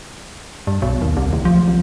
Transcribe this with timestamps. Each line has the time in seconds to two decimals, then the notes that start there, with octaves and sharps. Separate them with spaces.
0.67 G2
0.82 B1
1.02 D#2
1.17 C2
1.33 D1
1.45 F3
1.68 C2